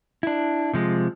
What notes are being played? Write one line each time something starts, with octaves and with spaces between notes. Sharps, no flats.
D4 E4
C3 F3 G#3